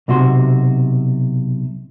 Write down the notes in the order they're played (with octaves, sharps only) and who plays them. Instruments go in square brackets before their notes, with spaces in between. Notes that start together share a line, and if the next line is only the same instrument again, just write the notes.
[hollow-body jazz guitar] B1 C3 F#4 C6